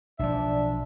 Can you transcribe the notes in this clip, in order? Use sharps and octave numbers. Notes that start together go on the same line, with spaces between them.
B1 F3 D4 E5